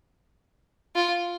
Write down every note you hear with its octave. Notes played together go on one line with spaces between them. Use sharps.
F4